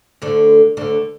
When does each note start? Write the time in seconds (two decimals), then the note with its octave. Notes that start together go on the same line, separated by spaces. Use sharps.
0.22 D2 D3
0.77 D2 D3